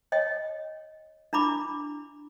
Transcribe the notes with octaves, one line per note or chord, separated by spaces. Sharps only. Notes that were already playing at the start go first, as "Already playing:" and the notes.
C#5 D#5 G5
D4 E4 B5 D6